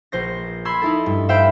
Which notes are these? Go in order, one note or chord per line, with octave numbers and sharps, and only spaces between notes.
A#1 C5 A#6
B5 C6 E6 G#6
D#4 E4 A4
G2
C5 E5 F5 G5 B5